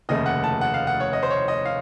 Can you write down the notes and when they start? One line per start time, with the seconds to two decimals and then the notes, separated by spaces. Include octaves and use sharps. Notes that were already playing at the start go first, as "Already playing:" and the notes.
0.09 F1 D#2 C#3 A3 D#5
0.26 F#5
0.44 A5
0.61 F#5
0.74 F5
0.87 F#5
1.00 C#5
1.13 D#5
1.23 C5
1.30 C#5
1.48 D#5
1.65 F5